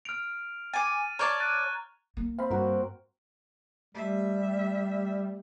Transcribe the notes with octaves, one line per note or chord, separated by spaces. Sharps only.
F6 D7 F7
G#5 D6 A6 D#7
C#5 D5 A5 A#5 C#6 F6 G#6
F#6 A6 D#7
A#3
C4 F5 B5
G2 F#4 A#4
G3 A3 G4 D#5 E5